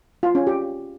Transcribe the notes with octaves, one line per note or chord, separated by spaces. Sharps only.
F4
C#4
G4